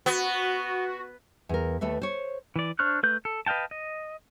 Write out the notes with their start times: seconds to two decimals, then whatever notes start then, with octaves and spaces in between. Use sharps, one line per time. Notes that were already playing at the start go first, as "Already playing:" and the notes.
0.06 B3 F#4
1.49 E2 A#4
1.81 D#2 A3 A4 B4 E5
2.02 C5 C#5
2.56 E3 D5
2.79 D4 C5 C#6 F6 F#6
3.03 A3 B4 G6
3.25 A4
3.46 B4 D#5 F5 G5 A5
3.71 D#5